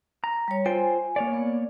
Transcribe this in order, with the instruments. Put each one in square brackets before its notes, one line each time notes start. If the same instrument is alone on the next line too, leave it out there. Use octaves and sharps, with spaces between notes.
[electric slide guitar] A#5
[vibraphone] G3 C#5
[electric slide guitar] F4 C5 G5 [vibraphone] G#5
[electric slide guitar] A#3 C#5 D5
[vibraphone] B3